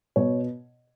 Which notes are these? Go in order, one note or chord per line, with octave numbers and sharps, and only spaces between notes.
B2 C#5